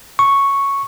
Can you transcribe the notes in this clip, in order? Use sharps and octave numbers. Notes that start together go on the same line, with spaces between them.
C#6